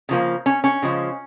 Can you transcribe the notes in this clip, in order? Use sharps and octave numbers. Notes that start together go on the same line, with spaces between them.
C#3 F3 A#3
C#4
C#4
C#3 F3 G#3